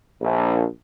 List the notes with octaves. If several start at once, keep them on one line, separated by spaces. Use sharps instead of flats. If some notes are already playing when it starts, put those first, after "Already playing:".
A#1